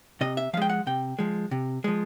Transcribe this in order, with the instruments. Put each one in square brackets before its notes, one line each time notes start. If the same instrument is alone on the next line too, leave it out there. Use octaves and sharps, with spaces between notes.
[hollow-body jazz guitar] C3 D#5
E5
F3 F5
G#3 G5
F#5
C3 G5
F3 G#3
C3
F3 G#3